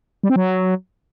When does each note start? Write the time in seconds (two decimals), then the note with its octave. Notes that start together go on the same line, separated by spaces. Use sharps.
0.23 G3
0.30 C4
0.36 F#3